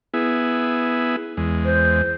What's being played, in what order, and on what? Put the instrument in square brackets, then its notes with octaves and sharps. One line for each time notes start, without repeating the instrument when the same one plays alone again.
[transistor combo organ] B3 E4 G#4
E2 G#3
[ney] C5